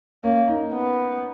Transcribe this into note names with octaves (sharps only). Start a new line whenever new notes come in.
A#3 C#4
D#4
B3